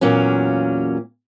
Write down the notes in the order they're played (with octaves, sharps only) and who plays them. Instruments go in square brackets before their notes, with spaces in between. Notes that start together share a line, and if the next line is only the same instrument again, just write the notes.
[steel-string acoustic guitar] E2 A#2 F#3 A#3 C#4